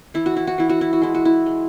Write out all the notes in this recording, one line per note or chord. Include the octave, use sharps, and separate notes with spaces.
E3 E4
F#4
E4
F#4
E3 E4
F#4
E4
F#4
G#3 E4
F#4
E4
G#3